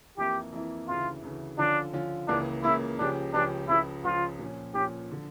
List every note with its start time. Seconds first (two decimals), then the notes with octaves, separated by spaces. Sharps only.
0.17 F2 E3 A#3 E4 G4
0.52 F2 E3 A#3 E4
0.87 D2 C#3 E3 F4
1.23 D2 C#3 E3
1.58 D3 F3 C#4 D4 F4
1.93 D3 F3 C#4 F4
2.28 C#2 C#3 E3 A#3 D4
2.63 C#2 C#3 E3 A#3 E4
2.99 C#2 C#3 F3 C#4 D4 G4
3.33 C#2 C#3 F3 C#4 D4 G4
3.69 C#2 C#3 F3 E4
4.04 C#2 C#3 F3 F4
4.39 A#2 F3 C#4
4.74 A#2 F3 C#4 G4
5.12 D3 F3